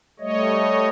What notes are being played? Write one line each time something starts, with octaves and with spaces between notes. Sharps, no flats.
G3 A3 C#5 D#5